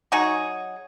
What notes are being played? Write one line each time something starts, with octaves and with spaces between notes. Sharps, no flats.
F#3 D#4 F#4 G#4